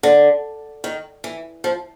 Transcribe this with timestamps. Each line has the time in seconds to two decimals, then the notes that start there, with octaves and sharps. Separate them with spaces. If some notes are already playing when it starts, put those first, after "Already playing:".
0.03 D3
0.84 D#3
1.24 E3
1.64 F3